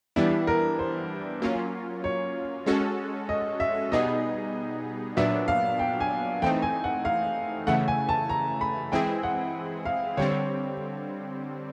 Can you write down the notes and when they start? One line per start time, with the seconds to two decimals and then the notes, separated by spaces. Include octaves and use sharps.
0.16 E3 G3 B3 D4 E4
0.47 A#4
0.79 C5
1.42 F#3 A#3 C#4 F4
2.04 C#5
2.66 G#3 C#4 F#4 A4
3.29 D#5
3.60 E5
3.92 B2 G3 B3 D#4 G#4 D#5
5.17 A#2 F#3 B3 D4 E5
5.48 F5
5.79 G5
6.00 G#5
6.42 E3 A3 C4 D#4 G5
6.62 G#5
6.84 F#5
7.05 F5
7.67 C#3 E3 A3 F#5
7.88 G#5
8.09 A5
8.29 A#5
8.61 B5
8.92 E3 G#3 C4 E4 G#4 G5
9.23 F#5
9.85 F5
10.17 D3 G3 C4 C#5